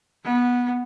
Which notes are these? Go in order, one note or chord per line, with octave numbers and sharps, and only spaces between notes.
B3